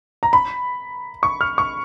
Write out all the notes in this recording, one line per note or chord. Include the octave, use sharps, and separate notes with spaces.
A#5
B5
C#6
F6
C#6